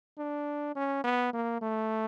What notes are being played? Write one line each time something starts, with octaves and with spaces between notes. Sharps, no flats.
D4
C#4
B3
A#3
A3